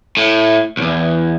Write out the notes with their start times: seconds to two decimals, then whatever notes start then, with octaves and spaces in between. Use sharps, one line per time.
0.17 A2
0.77 B1 E2